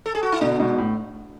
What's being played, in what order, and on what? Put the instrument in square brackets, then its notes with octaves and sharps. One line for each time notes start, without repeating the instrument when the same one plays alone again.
[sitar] A4
G#4
F#4
E4
[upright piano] B2 D3 [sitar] D4
[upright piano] G#2 B2
A2